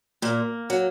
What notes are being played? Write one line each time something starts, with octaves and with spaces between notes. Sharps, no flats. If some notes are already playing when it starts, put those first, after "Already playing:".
A#2 A#3
F#3